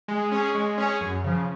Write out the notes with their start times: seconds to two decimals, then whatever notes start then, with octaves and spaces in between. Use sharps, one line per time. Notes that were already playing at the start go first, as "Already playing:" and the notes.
0.08 G#3
0.31 C#4 G#4 C#5
0.55 G#3
0.78 C#4 G#4 C#5
1.01 F#2
1.24 C#3 F3